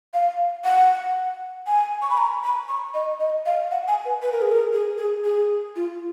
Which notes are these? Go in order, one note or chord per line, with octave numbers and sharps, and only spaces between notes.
F5
F#5
G#5
C#6
B5
A#5
B5
C#6
D#5
D#5
F5
F#5
G#5
B4
B4
A#4
G#4
A#4
G#4
G#4
G#4
F4